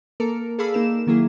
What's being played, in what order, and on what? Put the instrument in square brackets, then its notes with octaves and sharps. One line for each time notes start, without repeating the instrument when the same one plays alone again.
[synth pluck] A#3 A4 A#4
G#4 A4 D5 F5 B5 E6
A#3 D#4 A#4 E7
D#3 F#3 A#3 E4 G#4